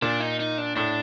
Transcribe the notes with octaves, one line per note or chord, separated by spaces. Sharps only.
A#2 D4
D#4
D#4
D4
A2 D4